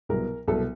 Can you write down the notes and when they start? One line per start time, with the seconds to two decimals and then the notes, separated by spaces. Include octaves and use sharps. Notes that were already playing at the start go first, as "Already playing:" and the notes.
0.09 C2 B2 F#3 A#4
0.48 C2 B2 F#3 A4